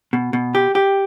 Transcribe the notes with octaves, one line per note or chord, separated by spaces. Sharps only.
B2
B2
G4
G4